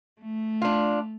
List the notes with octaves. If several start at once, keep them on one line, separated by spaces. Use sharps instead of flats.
A3
D4 F4